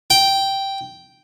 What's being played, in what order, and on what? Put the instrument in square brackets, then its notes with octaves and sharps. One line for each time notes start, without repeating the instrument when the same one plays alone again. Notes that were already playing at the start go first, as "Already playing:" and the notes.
[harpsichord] G5